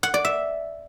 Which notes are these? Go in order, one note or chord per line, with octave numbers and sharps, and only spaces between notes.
F#5
D5
E5